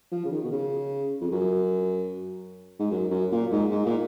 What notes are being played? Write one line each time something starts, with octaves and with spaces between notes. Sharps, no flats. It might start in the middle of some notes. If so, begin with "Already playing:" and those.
F3
C#3
D#3
B2
C#3
F2
F#2
G#2
F#2
F#2
A#2
G#2
G#2
A#2